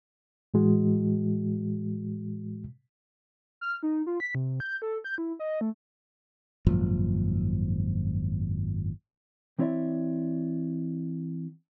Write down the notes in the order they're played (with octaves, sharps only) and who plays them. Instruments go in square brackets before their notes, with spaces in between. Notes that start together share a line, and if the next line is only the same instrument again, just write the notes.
[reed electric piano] A2 E3 G#3 F#4
[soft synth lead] F6
D#4
F4
B6
C3
G6
A4
G6
E4
D#5
A3
[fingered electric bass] G#1 F#2 A#2 F3
[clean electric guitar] E3 C4 E4 C#5 D5 E5